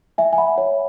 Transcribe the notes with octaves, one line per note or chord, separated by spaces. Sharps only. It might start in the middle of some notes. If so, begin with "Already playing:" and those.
E5 G#5
G#5
F#5 B5
C#5